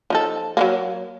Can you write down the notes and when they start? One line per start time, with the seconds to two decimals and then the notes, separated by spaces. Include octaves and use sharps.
0.10 F3 D#4 A4
0.57 F#3 A3 A#3